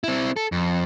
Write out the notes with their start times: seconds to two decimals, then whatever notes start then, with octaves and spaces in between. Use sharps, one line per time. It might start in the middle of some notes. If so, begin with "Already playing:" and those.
0.04 C4 E4
0.36 A4
0.52 F2